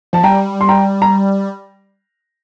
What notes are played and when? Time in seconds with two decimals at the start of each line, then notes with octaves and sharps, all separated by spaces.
0.13 F3 A5
0.23 G3 G5 A#5
0.61 C6
0.69 G5 A#5
1.02 A#5